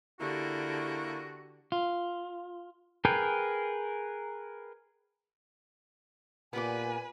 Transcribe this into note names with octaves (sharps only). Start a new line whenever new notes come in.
D3 A#3 E4 F#4 G4
F4
G#4 A#4 B4 G5
A#2 B3 G4 B4 D5 G#5